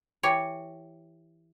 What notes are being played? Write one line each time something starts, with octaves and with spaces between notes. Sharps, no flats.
E3 G4 C#5